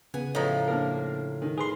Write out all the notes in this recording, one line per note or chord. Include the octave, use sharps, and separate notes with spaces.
C#3 B3 G#5
A2 F3 C#5 D#5 A#5
A#3 D4 A#4
D#3
G#4 B4 C6